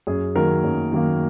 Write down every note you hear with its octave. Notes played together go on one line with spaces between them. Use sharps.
F#2 G#4
D#3 F#3 A#3 A#4
F#2
D#3 F#3 A#3